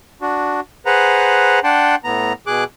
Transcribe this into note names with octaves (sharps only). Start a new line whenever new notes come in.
D4 F#4
G#4 B4 C5 F#5 A#5
D4 F#5 G5 A5 C6
A2 B3 A#5
B2 G#4 D6 F#6